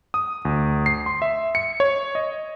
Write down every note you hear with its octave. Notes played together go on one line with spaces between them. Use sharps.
D#6
D2
C7
C6
E5
C#7
C#5
D#5